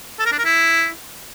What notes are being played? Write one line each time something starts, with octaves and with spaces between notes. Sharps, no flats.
A4
A#4
D4
A#4
E4